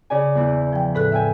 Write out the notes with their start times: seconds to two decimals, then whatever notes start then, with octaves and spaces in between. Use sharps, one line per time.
0.10 C#3 D5 G#5
0.35 E2 E3
0.73 F3 G5
0.95 A2 A4 B4 F#6
1.12 E5 G5 G#5